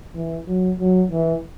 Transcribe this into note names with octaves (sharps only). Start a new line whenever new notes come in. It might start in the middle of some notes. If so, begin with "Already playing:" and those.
E3
F#3
F#3
E3